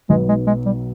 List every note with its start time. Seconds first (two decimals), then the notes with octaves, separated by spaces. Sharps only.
0.09 B1 B2 F#3 G#3 B3 D#4
0.29 G#3
0.47 G#3
0.66 G3